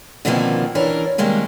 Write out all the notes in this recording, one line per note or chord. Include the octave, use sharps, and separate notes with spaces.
B2 D3 D#3 F3 A#3 C4
E3 C#4 D4 A#4
C3 D#3 G3 G#3 A#3